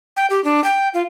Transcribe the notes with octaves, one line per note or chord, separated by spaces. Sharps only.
G5
G4
D4
G5
F4